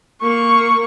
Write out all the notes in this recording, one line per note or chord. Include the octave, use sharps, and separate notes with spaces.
A#3 C#6